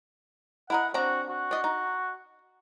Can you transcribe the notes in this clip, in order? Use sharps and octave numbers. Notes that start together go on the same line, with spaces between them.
E4 A#4 D#5 F#5
C4 D4 F#4 A#5
F#4
D4 D#5
D#4